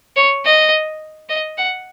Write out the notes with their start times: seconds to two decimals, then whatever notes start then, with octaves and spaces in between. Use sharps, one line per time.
0.16 C#5
0.45 D#5
1.29 D#5
1.58 F#5